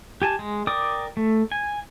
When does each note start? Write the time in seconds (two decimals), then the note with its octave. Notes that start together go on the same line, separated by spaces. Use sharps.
0.22 G4 G#5 A5
0.39 G#3
0.67 A#4 D5 G5 D6 D#6
1.17 A3
1.52 G#5